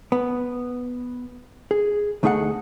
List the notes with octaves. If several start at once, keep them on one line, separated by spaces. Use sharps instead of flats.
B3
G#4
D2 A3 D#4 G#4 E5 F#5